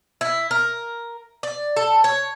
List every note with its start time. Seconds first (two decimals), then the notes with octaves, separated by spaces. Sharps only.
0.21 E4
0.51 A#4
1.43 D5
1.77 A4
2.04 C#5